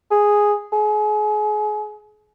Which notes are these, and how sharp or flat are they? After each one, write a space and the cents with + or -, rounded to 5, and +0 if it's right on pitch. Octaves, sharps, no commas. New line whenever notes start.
G#4 -5
G#4 +30